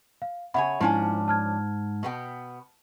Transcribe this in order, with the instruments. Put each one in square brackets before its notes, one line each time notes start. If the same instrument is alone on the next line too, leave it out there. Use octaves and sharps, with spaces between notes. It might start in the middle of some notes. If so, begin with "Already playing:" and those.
[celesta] F5
[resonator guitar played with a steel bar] C#3 C#5 G#5 [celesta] E5 F#5 B5
[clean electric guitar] G#2 [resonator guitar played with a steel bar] F3 C#4 D4 [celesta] E4 G#5
[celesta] A5 F6 G#6
[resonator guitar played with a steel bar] B2 B3 G5